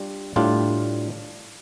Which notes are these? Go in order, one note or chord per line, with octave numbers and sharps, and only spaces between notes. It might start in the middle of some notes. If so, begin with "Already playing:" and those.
Already playing: G3 D4 F4
A2 G3 D4 F4